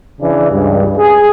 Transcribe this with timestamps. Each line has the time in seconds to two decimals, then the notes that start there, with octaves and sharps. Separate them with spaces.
0.21 C#3 E3 D4
0.51 C#2 G2
0.98 G#4